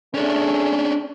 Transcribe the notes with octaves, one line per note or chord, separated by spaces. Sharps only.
A3 C#4 D4 G#4